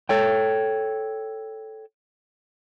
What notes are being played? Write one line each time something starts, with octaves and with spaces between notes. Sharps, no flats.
A4 C#5 G5